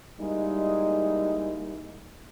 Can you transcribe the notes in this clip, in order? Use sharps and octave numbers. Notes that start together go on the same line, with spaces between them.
G3 G#3 A#3 D#4 E4